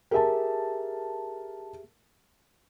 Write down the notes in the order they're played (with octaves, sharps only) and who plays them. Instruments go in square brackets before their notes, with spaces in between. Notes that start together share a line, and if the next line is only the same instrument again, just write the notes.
[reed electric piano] G4 G#4 E5 [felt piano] A#4 A5